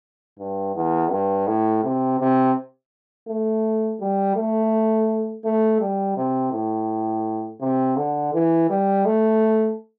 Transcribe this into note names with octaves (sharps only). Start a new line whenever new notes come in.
G2
E2
G2
A2
C3
C3
A3
G3
A3
A3
G3
C3
A2
C3
D3
E3
G3
A3